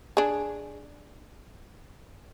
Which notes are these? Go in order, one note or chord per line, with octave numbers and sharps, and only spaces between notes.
D4 G#4